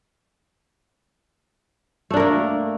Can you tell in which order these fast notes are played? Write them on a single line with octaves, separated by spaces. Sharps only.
A3 D4 A#4 A#3